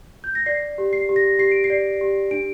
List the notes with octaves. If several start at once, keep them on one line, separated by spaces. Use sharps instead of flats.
G6
A#6
D5 C7
G4
C7
G4
A#6
G4 C7
D7
C7
D5
G4
D4 D7